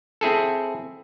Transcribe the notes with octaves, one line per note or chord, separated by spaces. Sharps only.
C4 E4 G#4 A4